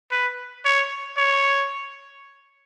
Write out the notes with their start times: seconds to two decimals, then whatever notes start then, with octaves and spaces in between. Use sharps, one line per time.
0.11 B4
0.65 C#5
1.17 C#5